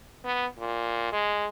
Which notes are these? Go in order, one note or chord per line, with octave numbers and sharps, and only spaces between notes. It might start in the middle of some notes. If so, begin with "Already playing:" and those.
B3
A#2
G#3